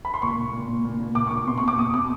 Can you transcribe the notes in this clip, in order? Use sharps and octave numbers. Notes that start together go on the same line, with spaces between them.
B5
C6
A#2 C#6
A#2
A#2
A#2
A#2
A#2
A#2 D6
C#6
A#2 D6
B2 C6
C#6
B2
D6
B2 D#6
B2 D6